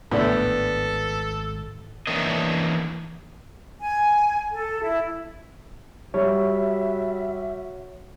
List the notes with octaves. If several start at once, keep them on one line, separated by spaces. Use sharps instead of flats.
G#1 A2 D3 B3 A4 D5
E3 A#3 C#4 D4 A#4 D#5
G#5
A4
E4
G3 F#4 C#5 E5